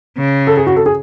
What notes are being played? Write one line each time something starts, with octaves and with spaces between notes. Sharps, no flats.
C#3
A4
G#4
F#4
A4
G#4